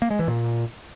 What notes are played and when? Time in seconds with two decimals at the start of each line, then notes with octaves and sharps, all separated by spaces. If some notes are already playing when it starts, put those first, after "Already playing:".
0.02 A#3
0.11 G#3
0.19 E3
0.28 A#2